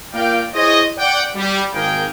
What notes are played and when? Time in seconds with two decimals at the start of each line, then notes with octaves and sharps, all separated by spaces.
0.13 A#3 F4 A#4 D5 F5 G5
0.54 E4 G#4 C5 C#5 D#5
0.97 D5 F#5 G5
1.35 G3
1.73 G#1 D#3 A#3 G#4 A#4 G5